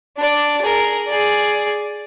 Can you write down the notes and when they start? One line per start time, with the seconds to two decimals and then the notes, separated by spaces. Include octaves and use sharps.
0.17 D4 D5
0.62 G#4 A#4
1.08 G#4 D5